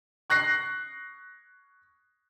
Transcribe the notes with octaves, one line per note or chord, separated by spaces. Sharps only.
C#6 F#6 A#6 C7